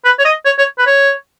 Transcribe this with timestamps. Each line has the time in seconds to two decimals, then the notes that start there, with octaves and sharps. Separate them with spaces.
0.05 B4
0.19 C#5
0.25 D#5
0.45 C#5
0.58 C#5
0.78 B4
0.87 C#5